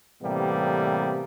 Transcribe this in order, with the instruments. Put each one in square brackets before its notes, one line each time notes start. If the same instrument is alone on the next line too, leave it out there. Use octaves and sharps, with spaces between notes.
[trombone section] A2 C3 E3 G3 A#3 B3